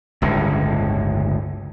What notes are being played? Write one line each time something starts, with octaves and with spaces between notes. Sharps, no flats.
G1 C#2 A2 D3